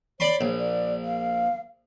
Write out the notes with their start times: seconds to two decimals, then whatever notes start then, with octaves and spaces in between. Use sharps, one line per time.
0.20 C#5 D5 B5 C6
0.41 A#1
0.59 D5
1.05 F5